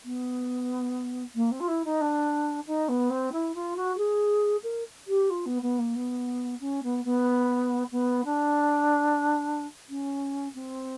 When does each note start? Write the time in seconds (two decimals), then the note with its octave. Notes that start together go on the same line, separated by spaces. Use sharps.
0.04 B3
1.35 A#3
1.51 C4
1.60 F4
1.67 E4
1.84 D#4
2.01 D4
2.66 D#4
2.88 B3
3.10 C4
3.32 E4
3.54 F4
3.76 F#4
3.97 G#4
4.63 A#4
5.07 G4
5.30 F4
5.45 B3
5.62 B3
5.78 A#3
5.95 B3
6.60 C#4
6.83 B3
7.04 B3
7.91 B3
8.24 D4
9.89 C#4
10.54 C4